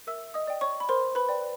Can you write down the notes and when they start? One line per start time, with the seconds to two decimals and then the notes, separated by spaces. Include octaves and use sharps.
0.07 A#4 E5 E6
0.34 D#5 D#6
0.47 D5 G5
0.61 C#5 C#6
0.80 B5
0.89 A#4 C5 C6
1.15 B4 B5
1.29 D5 G5